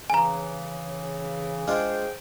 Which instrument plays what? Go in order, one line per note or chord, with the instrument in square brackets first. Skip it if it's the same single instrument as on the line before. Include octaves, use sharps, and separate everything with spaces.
[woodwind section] C#3 E3 [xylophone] G#5 A#5
[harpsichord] G#3 D4 F4 [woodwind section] G#4 C5 G5